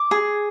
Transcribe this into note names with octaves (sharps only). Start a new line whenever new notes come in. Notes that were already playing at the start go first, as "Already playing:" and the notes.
Already playing: D6
G#4